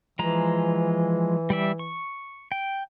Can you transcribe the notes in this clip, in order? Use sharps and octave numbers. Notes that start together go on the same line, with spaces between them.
E3 F3 G#3 A#5
G3 D5 E5
C#6
G5